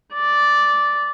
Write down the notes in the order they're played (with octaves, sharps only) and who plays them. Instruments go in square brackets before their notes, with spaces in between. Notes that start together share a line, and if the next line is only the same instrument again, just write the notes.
[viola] D5